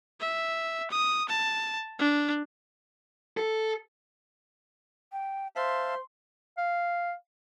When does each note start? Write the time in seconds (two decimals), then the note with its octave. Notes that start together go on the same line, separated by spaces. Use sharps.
0.21 E5
0.91 D#6
1.29 A5
1.99 D4
3.37 A4
5.12 G5
5.56 C5 E5 F5 A5 C6
6.58 F5